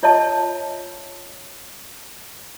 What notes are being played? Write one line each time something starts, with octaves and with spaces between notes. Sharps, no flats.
F4 C#5 D#5 E5 A5